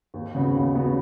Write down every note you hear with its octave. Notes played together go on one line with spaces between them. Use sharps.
D#2
C#3 B3 F#4
D#2
C#3 B3 F#4